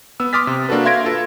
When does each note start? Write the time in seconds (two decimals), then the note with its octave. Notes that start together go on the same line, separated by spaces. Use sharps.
0.20 B3 E6
0.33 C6 D6 D#6 F6 A6 B6
0.47 C3
0.69 A#3 D4 F#4 A4 B4
0.85 E5 F5 C6 G#6 A#6 D7
1.05 F4 A4 B4